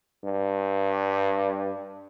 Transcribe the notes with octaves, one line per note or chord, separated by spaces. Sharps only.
G2